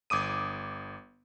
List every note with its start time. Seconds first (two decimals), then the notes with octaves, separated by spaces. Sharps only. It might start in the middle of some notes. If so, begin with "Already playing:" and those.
0.10 G1 D6 D#6 D#7